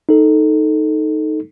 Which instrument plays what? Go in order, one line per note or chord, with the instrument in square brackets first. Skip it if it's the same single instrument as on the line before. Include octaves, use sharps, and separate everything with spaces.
[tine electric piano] D#4 A4